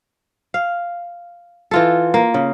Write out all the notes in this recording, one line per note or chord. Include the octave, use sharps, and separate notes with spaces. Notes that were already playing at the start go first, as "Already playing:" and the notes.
F5
E3 F4 A4
A#3
C#3